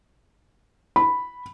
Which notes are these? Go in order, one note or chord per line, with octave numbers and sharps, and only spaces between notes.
B5